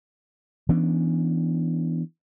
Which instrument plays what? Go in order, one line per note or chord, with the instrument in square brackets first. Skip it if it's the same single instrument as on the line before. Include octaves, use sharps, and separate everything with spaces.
[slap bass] E3 B3 C#4 D4